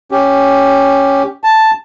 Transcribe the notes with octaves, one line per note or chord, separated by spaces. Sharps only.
C#4 G4
A5